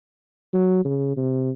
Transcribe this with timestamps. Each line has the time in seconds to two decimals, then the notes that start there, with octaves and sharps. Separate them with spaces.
0.53 F#3
0.85 C#3
1.17 C3